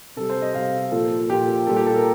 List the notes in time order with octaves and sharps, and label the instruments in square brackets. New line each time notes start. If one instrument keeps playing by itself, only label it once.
[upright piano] C3 G3 A4
C5
D#5
C3 G3 F5
A#2 F3 A4
A#2 F3 G4
A#2 G3 A4
G4
A4
A#4